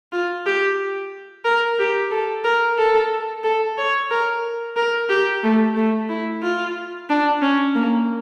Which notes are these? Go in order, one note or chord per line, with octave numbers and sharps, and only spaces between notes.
F4
G4
A#4
G4
A4
A#4
A4
A4
C#5
A#4
A#4
G4
A3
A3
E4
F4
D4
C#4
A#3